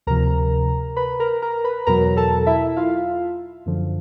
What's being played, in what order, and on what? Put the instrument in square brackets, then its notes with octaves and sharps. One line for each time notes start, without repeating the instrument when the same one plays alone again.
[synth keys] D2 C3 F3 A#4 A#5
B4 B5
A#4 A#5
A#4 A#5
B4 B5
E2 B2 F#3 A#4 A#5
A4 A5
E4 E5
F4 F5
F#2 D3 F3